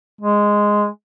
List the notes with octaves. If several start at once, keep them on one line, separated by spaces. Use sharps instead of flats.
G#3